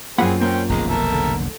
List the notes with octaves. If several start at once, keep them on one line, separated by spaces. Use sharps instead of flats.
F#2 A#3 C4 F4 G#4 F#5 B5
A#3 C4 C#4 G5
F1 B1 D#3 G#3 A#4
A4 A#4 E5
D3